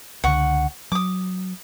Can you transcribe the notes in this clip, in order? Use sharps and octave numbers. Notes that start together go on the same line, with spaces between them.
C#2 D3 F#5 C#6
F#3 D6 D#6